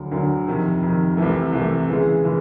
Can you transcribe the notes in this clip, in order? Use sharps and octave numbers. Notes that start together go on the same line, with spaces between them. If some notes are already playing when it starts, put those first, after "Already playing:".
Already playing: D2 D3 F#3
D2 D3 F#3
F2 C3 D#3
F2 C3 D#3
C2 C3 E3 A3
C2 C3 E3 A3
C#3 E3 G#3
C#3 E3 G#3